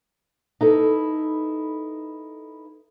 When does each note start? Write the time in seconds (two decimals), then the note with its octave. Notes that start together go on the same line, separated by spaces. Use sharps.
0.61 D#4 E4 A4 B4